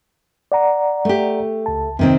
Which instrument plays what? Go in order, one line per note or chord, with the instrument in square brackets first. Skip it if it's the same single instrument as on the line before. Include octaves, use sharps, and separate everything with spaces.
[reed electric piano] D5 F#5 A#5
[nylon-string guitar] A3 G4
[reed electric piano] C#2 A5
[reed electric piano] F2 [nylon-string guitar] C3 D#3 C4